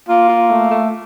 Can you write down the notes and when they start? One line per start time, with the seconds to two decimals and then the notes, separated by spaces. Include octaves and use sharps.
0.08 A#3 F4
0.29 F4
0.50 A3
0.71 A3